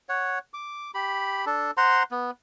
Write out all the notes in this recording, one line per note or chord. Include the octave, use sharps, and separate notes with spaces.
C#5 F#5
D6
G4 B5
D4 A4
C5 F#5 A#5 C6
B3